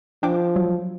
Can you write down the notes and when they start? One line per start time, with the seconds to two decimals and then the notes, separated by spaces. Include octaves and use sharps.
0.23 F3 D4 G5 D6
0.56 F#3